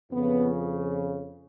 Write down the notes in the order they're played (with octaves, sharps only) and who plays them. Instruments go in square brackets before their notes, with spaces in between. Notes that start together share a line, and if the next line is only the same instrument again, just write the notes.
[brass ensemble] F2 C#3 F3 B3